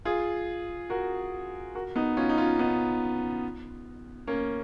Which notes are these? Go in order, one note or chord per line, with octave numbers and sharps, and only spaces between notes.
F4 G#4
F#4 A#4
F#4 A#4
B3 D#4
C#4 F4
D#4
C#4 F4
B3 D#4
A#3 C#4